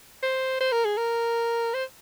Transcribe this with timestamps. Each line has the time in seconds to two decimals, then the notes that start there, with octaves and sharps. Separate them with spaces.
0.23 C5
0.60 C5
0.72 A#4
0.85 G#4
0.97 A#4
1.74 C5